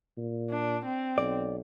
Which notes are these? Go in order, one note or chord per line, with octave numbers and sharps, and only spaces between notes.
A#2
D4
C4
B1 D5